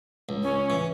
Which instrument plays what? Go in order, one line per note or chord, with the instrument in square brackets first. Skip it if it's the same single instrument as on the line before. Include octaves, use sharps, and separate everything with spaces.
[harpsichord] C#2
[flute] C#4
[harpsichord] E3